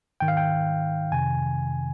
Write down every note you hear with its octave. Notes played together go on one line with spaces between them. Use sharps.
G#2 D#3 G5
F5
G5
F2 C3 D#3 G#5